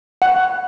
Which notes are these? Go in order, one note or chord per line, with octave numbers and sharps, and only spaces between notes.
F#5